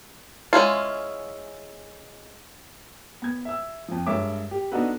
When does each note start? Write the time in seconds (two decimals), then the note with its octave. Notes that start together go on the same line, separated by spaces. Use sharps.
0.53 G#3 C#4 E4 F4
3.22 B3 G#6
3.45 E5 E6
3.88 F2 F3
4.06 G2 G#3 A#4 C#5 E5 D6
4.51 G4
4.71 B3 D4 D#4 F#4 A4 B4